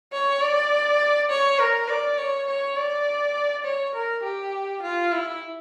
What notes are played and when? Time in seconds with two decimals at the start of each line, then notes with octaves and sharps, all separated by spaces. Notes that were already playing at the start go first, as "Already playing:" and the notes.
0.13 C#5
0.41 D5
1.30 C#5
1.59 A#4
1.89 D5
2.17 C#5
2.47 C#5
2.76 D5
3.65 C#5
3.94 A#4
4.24 G4
4.82 F4
5.12 E4